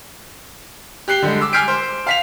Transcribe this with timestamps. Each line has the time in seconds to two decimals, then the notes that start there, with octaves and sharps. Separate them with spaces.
1.08 G4 F#6 C7 G7
1.22 D3 G3 G#3
1.41 D6 E6
1.53 G#5 F6 G6 B6 C7 D7
1.68 C5
2.07 F5 B6 F7